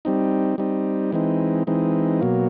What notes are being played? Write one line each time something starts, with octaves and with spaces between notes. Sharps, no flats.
G3 C4 D#4
G3 C4 D#4
E3 G#3 C4 D#4
E3 G#3 C4 D#4
B2 F#3 A#3